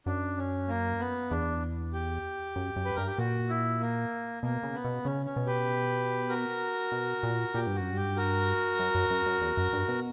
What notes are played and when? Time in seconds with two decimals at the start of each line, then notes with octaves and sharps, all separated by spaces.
0.06 F#2 D4
0.37 C#4
0.68 A#3
1.00 B3
1.30 E2 D4
1.93 G4
2.56 F#2
2.76 F#2
2.85 B4
2.96 G2 A#4
3.07 G4
3.18 A#2 F#4
3.49 E4
3.80 A#3
4.43 B2 A#3
4.63 C#3
4.74 B3
4.84 B2
5.05 C#3 C#4
5.26 C#4
5.36 B2
5.46 G4 B4
6.29 F#4 A#4
6.92 B2
7.23 A#2
7.54 A#2 G4
7.67 G2
7.75 F#2 F#4
7.93 G2 G4
8.16 F#4 A#4
8.79 F#2
8.95 F#2
9.10 F#2
9.26 F#2
9.41 E2
9.57 F#2
9.73 G2
9.88 B2